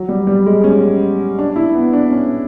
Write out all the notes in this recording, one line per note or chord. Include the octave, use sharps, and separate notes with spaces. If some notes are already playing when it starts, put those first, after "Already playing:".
Already playing: F#3
G3
G3
G#3
C#4
D4
E4
B3
D4
C#4